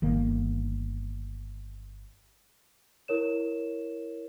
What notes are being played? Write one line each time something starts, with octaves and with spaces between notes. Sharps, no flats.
G1 D#3 A#3
E4 A#4 C#5 E7